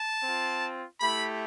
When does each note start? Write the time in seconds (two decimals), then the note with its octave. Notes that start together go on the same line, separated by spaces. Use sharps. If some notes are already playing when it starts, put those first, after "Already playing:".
Already playing: A5
0.24 C4 F4
1.00 A3 E4 G4 B5